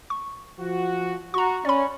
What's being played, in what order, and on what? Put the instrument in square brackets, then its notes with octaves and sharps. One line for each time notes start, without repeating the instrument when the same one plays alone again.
[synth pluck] C#6
[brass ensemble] F3 F#4
[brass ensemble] F#4 [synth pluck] A#5 C#6
[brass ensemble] C#4 [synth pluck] D5 B5